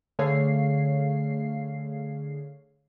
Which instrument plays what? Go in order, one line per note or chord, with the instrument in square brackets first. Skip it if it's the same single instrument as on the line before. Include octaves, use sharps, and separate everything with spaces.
[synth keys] D3 A3 G#4 C#5 F5 C7